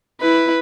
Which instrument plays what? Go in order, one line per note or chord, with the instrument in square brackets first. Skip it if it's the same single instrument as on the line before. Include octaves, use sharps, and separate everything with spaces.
[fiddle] E4 [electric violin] B4